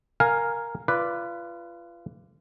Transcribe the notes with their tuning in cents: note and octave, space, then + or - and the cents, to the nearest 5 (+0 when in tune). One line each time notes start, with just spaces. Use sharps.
A#4 +0 F5 +10 G#5 +0
F4 -30 B4 +0 D5 +0